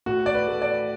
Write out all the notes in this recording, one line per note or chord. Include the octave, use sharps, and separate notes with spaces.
A2 F#4
D5
B4
A3
D5